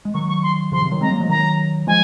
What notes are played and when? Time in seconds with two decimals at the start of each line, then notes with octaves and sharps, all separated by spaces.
0.05 G#3
0.14 D#3 F#3 C#6
0.28 C#6
0.43 C6
0.72 C#3 F3 C6
0.81 C3 D#3
0.91 D#3 F#3
1.01 G#3 C4 A#5
1.10 F#3 A#3
1.20 F3 G#3
1.29 D#3 F#3 A#5
1.87 F3 G#3 G#5